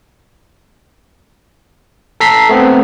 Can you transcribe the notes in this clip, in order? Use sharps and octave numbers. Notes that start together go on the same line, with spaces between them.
A4 A#5 B6 C7
A3 B3 C4